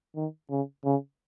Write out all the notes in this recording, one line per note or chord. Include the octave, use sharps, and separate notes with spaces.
D#3
C#3
C#3